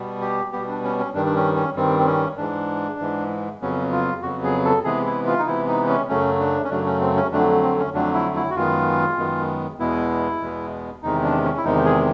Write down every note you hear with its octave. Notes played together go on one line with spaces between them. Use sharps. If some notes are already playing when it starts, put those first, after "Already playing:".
Already playing: B2 G3 B3
G4
B2 G3 B3 G4
D4
C#4
C#4
G2 D#3 G3 D4
D4
C#4
C#4
G2 D#3 G3 C4
C4
C#4
G#2 E3 G#3 D4
G#2 E3 G#3
F2 C#3 F#3 B3 C#4
F4
F2 C#3 F#3 B3 F#4
G#4
A4
C3 E3 G#3 B3 G#4
E4
F4
D#4
C3 E3 G#3 B3 E4
D#4
C#4
F#2 C#3 F#3 A3 C#4
D4
C#4
F#2 C#3 F#3 A3 D4
C#4
C4
C#4
F2 D3 F#3 A3 D4
C4
C#4
F2 D3 F#3 A3 D4
E4
E4
F#4
F#2 D#3 G#3 B3 F4
F#2 D#3 G#3 B3
E2 B2 G#3 B3 E4
E2 B2 G#3 B3
E2 C3 D#3 G#3 D#4
D4
C#4
E4
E2 C3 D#3 G#3 D#4
G#4